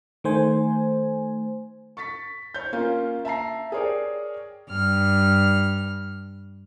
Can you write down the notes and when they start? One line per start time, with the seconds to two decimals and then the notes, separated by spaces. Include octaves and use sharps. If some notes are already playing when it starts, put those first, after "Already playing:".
0.24 D#3 A3 C5 G#5
1.97 C#6 A6 B6
2.54 C#5 G6
2.73 A#3 C#4 F4
3.25 E5 A5 A#5 C7
3.72 G#4 A#4 C#5 D5 G5
4.69 G2 F6